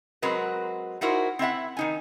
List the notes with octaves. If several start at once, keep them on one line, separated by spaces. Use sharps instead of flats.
F#3 G#3 C4 F#4 A#4 B4
D#4 E4 F#4 A#4 C5
C4 E4 E5 F#5
D#3 D#4 G#5